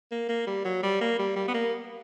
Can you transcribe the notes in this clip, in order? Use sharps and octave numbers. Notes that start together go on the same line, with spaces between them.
A#3
A#3
G3
F#3
G3
A#3
G3
G3
B3
A#3